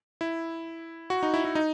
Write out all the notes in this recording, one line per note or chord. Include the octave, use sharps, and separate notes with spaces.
E4
F#4
D#4
E4
E4
D#4